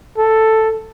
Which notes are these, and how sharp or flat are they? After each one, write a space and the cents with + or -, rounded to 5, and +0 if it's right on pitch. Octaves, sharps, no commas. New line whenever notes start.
A4 +5